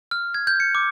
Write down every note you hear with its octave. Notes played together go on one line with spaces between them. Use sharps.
F6
G#6
G6
C#7
D6